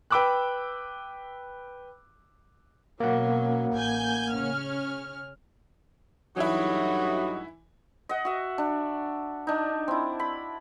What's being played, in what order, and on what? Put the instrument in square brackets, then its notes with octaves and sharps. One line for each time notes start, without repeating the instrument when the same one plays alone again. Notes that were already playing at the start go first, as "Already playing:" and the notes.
[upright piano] B4 G5 B5 D6 E6 F#6
[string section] B2 F#3 C#4 [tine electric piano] A#3 F#5
[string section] A1 G#5 G6
C#3 C#4 F6
[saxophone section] G2 A3 D#4 [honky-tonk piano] E3 E4 [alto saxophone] F#3 [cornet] F#4
[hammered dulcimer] D#5 F#5
F#4 E5
D4
D4 D#4
C4 E4
B5